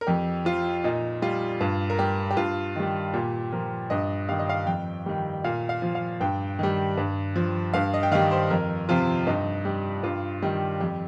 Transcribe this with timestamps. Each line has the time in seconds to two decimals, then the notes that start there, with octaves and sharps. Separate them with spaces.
0.01 A#4
0.07 F2 G4
0.45 F3 F4
0.84 A#2 D#4
1.22 G3 F4
1.61 G2 F4
1.90 A#4
1.99 G3 G4
2.31 G4
2.37 G2 F4
2.76 D#3 G3
3.14 A#2 G4
3.52 F3 A#4
3.90 G2 D#5
4.29 D#3 G3 F5
4.39 D#5
4.49 F5
4.67 F2 G5
5.06 D#3 G3
5.44 A#2 F5
5.69 F5
5.82 F3
5.95 F5
6.20 G2 G5
6.59 D#3 G3
6.97 G2
7.36 F3
7.74 G2 F5
7.94 D#5
8.03 G5
8.12 D#3 G3 F5
8.31 C5
8.50 F2 A#4
8.89 C3 F3 F4
9.27 G2 D#4
9.65 G3
10.03 G2 F4
10.42 D#3 G3
10.80 F2 G4